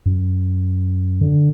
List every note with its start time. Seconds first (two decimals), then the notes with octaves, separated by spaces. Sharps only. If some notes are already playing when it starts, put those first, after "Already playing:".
0.06 F#2
1.21 D3